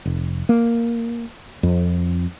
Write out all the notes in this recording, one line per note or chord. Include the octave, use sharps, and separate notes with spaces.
F1
A#3
F2